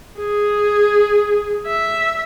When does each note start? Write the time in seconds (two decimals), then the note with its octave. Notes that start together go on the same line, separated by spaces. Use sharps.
0.18 G#4
1.67 E5